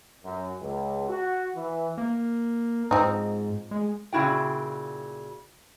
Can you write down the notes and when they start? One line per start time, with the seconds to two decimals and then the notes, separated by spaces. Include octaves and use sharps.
0.24 F#2
0.61 C#2
1.08 F#4
1.55 E3
1.98 A#3
2.91 G#2 F3 C4 D#4
3.71 G#3
4.13 A#2 C#3 E4 F#4 G5